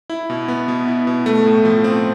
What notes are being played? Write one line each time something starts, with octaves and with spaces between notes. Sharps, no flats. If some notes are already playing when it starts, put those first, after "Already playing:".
E4
B2
B3
B2
E4
B2
A3
A2
F3
C4